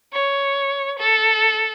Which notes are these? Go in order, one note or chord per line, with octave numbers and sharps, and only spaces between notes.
C#5
A4